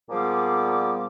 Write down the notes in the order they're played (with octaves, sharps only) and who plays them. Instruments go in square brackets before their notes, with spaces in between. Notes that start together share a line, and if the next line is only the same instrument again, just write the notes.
[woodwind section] A#2 F3 G3 B3 G#4 D6